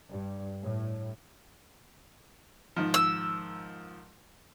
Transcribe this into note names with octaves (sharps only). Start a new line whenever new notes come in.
G2
A2
G#2 D#3 F3
E6